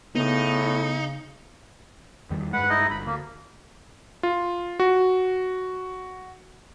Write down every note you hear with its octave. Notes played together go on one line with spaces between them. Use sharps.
A2 C#3 B3 D#4
E2 D#3 G3
G2 G#3 B4 F#5
D#4 E4 D#5
G1 B5
D2 A#3
F4
F#4